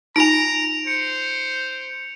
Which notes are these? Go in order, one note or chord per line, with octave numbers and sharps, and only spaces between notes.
D#4 F4 G#5 A#5 D7 F7
C5 C#7